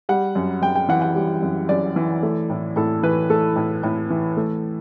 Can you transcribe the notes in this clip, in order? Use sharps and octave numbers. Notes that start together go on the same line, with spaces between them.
G3 F#5
F#2
F#2 G5
G5
E3 F#5
F#5
G3
F#2
F#2 D5
E3
A3
A2
A2 A4
E3 B4
A3 A4
A2
A2
E3
A3